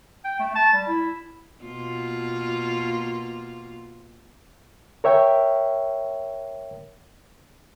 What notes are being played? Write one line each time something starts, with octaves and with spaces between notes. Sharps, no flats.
G5
A3
A5
G3
E4
B2 A#3 F4
A#4 C#5 E5 G5